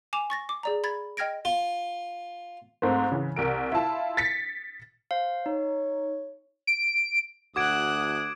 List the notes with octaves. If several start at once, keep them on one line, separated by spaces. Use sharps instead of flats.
G#5 D6 E7 F7
C#6 A6 A#6
D6
G#4 D5 A#5
B5 G#6 A6
D#5 G5 F6 G#6 A#6 D7
F4
G#2 A3 C4
C#3 E3
C2 A#4 D7
E4 F4 A5
A6 B6 C#7
C5 F5
D#4 C#5
D7
D2 F#4 D6 D#6 F#6 G#6 D7